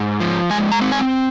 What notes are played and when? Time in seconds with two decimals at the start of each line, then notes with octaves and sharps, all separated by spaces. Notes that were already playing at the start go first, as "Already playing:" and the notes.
Already playing: G#2
0.20 F3
0.50 G#3 G#5
0.72 A#5
0.81 C4
0.92 G#5